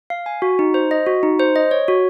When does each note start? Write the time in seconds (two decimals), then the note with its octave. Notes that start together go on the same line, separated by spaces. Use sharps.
0.10 F5
0.26 G#5
0.42 F#4
0.59 D#4
0.74 C5
0.91 D#5
1.06 F#4
1.23 D#4
1.39 C5
1.56 D#5
1.71 C#5
1.88 F#4